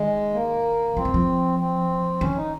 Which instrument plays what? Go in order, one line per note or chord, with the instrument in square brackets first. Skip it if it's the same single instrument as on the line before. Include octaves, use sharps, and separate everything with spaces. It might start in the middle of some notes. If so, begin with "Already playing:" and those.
Already playing: [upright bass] D#3 [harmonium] G#3
[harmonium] A#3
[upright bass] F3 [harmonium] C4
[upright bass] D#3
F3
[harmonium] C4
[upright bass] D#3 [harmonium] C#4
[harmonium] D#4